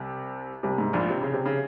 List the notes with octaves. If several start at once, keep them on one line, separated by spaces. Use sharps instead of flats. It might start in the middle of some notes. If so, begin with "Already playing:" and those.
Already playing: C2 C3
C2 C3
G#2
A#1 A#2
C3
C#3
C3
C#3